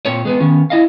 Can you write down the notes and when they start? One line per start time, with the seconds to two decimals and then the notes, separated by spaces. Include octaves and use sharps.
0.06 A#2 C4 C#5
0.25 G#3 B3 C4
0.40 D#3 B3 C#4
0.70 E4 D#5 F5